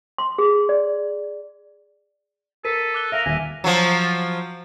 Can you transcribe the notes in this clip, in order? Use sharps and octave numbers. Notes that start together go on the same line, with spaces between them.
C6
G#4
D5
A4 A#4 B6 D#7
D6 F#6 G7
A#4 E5 F5 E6 A#6 F7
D#1 E5 G#5
F3 F#3